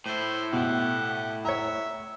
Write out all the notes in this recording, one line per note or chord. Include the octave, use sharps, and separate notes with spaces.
A2 E4 C5
B2 G4 F#5
C#5 E5 A#5